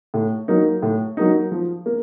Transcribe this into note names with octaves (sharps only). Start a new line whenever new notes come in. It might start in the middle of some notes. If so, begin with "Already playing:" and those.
A2
F#3 A#3 D#4
A2
F#3 A#3 D#4
F3
A#3